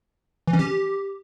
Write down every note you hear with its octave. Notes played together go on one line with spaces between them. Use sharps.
E3
C#4
G4